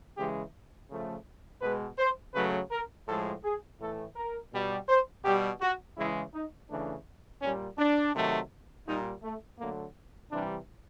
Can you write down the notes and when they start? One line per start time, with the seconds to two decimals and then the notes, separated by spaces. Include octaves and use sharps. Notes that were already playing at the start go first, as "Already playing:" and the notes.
0.17 C#3 E3 G#3 G4
0.89 C#3 F3 A3
1.62 B2 G#3 B4
1.98 C5
2.34 C#3 F#3 A3 B4
2.71 A#4
3.07 A2 F3 G#3 A4
3.43 G#4
3.79 A2 E3 A3 A4
4.16 A#4
4.52 B2 G3
4.88 C5
5.24 B2 G3 G4
5.61 F#4
5.96 C#3 E3 G#3 E4
6.33 D#4
6.69 C#3 E3 A3 D4
7.41 A#2 G3 C#4
7.78 D4
8.14 C3 D#3 F#3 A3
8.86 A#2 G3 D#4
9.23 A3
9.59 D3 F#3 A3 A#3
10.31 C3 E3 G3 D4